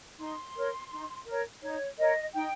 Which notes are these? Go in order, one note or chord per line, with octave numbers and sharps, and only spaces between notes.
D#4 C6
A#4 C#5
D#4
A#4 C#5
D#4 C#5
A#4 C#5 D#5
D#4 G5